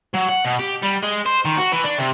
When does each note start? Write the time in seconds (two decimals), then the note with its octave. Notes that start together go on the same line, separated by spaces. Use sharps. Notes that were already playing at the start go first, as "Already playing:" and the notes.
0.15 F#3
0.29 F#5
0.45 B2
0.59 G4
0.83 G3
1.03 G#3
1.26 C5
1.45 D#3
1.57 F#4
1.72 E3
1.84 D4
1.98 C3